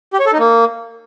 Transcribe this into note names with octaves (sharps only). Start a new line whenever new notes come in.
G4
C#5
A4
D#4
A#3